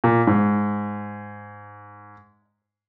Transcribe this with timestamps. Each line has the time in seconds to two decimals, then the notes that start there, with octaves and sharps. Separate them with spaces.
0.04 A#2
0.27 G#2